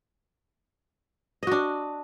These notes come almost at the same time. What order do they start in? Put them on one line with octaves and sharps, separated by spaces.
D#5 F#4 D4